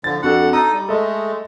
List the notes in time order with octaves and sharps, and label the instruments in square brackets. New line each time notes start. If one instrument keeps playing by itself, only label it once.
[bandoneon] D3 F3 [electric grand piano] A6
[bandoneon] F2 F#5 [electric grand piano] D4 F#4 A4
[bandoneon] D#4 A4 D#6 [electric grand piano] A#5
[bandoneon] G3
[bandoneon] G#3 A3 [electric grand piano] A4 D#5